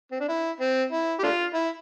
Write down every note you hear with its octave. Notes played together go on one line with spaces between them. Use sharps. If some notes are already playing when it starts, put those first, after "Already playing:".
C4
D4
E4
C4
E4
G4
A3 D4 F4
E4